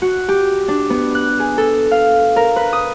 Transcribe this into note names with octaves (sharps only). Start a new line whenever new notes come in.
F#4
G4
D4
B3
F#6
G#4
A4
F5
A#4
B4
D#6